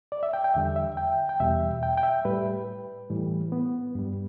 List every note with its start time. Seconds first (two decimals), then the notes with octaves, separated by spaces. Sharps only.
0.12 D5
0.23 E5
0.33 G5
0.44 G5
0.54 E2 D3 G3 E5
0.76 E5
0.97 G5
1.29 G5
1.40 E2 B2 G3 E5
1.83 G5
1.98 G5
2.03 E5
2.25 A2 G3 B4
3.10 A2 E3 G3
3.52 B3
3.95 G2 G3